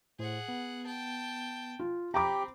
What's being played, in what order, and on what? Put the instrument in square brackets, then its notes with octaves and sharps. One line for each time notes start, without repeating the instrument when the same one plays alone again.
[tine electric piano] A2 C5 [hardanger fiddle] G#4 F#5
[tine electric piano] B3
[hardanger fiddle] G5 A5
[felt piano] F4
[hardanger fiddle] C4 [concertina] G4 G5 [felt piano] A#5 B5 D6